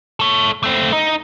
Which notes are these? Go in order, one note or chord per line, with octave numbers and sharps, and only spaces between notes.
A4 C#5
A3 C4
D#4